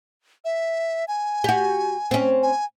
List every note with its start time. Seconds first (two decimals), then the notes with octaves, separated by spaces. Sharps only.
0.45 E5
1.08 G#5
1.44 F#4 G4
2.11 C4 C#4
2.43 G#5